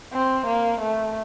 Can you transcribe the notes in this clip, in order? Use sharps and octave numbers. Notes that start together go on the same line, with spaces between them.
C4
A#3
A3